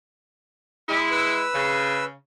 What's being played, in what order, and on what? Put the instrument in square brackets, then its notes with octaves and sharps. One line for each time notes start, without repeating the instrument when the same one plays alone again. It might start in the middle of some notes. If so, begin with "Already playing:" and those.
[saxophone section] G#3 E4
[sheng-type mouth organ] B4 E6
[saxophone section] C#3